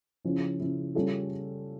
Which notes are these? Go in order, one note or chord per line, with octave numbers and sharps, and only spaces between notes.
C#3 F3 C#4 E4
C#3 F3 C#4 E4
C#3 G3 C#4 F4 A4